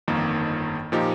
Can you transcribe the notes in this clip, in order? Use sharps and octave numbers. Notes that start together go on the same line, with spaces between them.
G1 F2 D#3 A#3
A#2 F3 D#4 G4